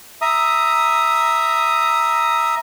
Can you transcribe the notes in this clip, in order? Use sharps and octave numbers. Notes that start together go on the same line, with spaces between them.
E5 A#5 D#6